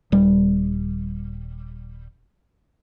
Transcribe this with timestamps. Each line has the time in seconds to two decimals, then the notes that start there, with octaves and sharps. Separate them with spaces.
0.12 D#1 G3